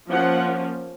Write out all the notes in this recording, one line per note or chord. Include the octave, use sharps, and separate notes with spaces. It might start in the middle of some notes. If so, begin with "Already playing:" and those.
F3 A#3 C#4 F#5